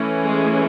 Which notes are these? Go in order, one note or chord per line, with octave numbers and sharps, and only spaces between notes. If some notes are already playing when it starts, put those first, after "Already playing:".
Already playing: E3 A3 C#4
G#3 G#4